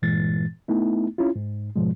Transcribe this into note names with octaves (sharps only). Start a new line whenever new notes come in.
G2 A#2 E3 G#3 A6
A3 B3 D#4 E4
C#4 E4 F4
G#2
G#2 B2 F3 G#3